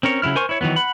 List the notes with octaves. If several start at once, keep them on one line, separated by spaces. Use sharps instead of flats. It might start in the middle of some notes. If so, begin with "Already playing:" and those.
C4 C#4 A#4 C#5
C#3 F#3 E4 F6
A#4 C5 G#5 C6 C#6
E4 C#5
D#3 E3 F#3 B3
F#5 B5